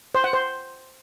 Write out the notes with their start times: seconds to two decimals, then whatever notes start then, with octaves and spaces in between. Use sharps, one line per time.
0.15 C5
0.24 F#5
0.33 C5